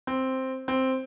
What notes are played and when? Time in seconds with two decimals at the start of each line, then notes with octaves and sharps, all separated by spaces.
0.07 C4
0.68 C4